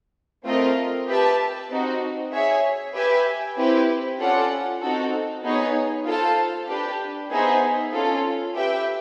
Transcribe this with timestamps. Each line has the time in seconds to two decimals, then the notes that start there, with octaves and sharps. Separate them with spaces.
0.44 A3 C4 F4 A#4 D#5
1.07 G4 B4 E5 A5
1.69 C4 D#4 F#4
2.32 G#4 C#5 E5
2.94 G4 B4 E5 G#5
3.57 C4 E4 G4 B4
4.19 C#4 F4 A4 D5 F#5
4.81 C4 D#4 F#4 A4
5.43 B3 D#4 G#4 C#5
6.05 F4 A4 C5 F5 A5
6.68 D4 G4 B4
7.31 B3 D#4 G#4 C5 E5
7.92 C#4 F4 A4
8.54 G4 B4 E5 G5